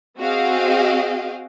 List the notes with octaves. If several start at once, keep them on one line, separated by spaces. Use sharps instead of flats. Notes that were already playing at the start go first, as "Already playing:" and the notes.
C4 F#4 G#4 D#5 F5 G5